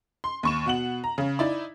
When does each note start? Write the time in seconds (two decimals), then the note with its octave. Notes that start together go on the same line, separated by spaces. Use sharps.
0.24 C6
0.43 D#2 C#6 E7
0.66 B2 F#5 F#7
1.04 A#5
1.18 C#3
1.39 D#4 E4 D5